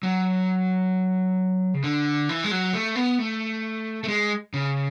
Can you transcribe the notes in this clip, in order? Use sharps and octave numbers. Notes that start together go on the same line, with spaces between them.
F#3
C#3
D3
E3
G#3
F#3
A3
B3
A3
A3
G#3
C#3